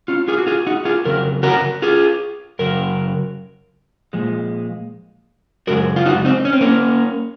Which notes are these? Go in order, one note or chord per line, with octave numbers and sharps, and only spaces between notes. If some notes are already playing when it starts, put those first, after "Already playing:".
C#4 F4
F4 G#4
F#4
F4 G#4
D#4 F#4
F4 G#4
F2 C#3 F#3 A#4
F#4 A#4
F4 G#4
F#2 C#3 F#3 A#4
A#2 F3 G#3
F#2 C#3 G#3 F#4 A#4
F4
D#4 F#4
C4 D#4
C#4
C4
A#3 C#4